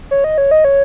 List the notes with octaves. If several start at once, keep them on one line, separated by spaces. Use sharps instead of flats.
C#5
D#5
C#5
D#5
C#5